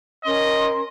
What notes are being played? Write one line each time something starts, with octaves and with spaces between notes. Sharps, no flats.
C#4 A#4 D#5 C6